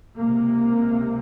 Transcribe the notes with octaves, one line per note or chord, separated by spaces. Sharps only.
C#2 C3 A#3